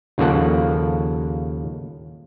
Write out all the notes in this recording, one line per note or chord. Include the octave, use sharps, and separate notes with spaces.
D#2 C#3 F3 A#3 A4 F#5